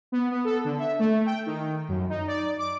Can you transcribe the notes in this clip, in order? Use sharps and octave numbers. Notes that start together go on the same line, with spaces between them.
B3
B3
A4
D3
E5
A3
G5
D#3
F#2
D#4
D5
D6